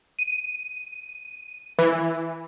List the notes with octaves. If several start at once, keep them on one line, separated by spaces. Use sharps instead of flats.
D#7
E3